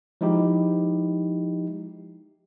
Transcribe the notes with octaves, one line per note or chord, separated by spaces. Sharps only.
F3 G#3 D#4 E4 G4